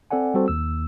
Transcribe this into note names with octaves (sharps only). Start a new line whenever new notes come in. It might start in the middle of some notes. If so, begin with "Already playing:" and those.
C4 A4 D5 F#5 G#5
G3 C4 F#4 A4 C5
D#2 E6